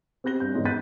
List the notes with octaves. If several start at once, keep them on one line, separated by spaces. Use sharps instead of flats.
C4 G4 F#6 A#6 G7
G2 G6
E2 G#2 B3 C#4
F#6 G6 A6 B6 D#7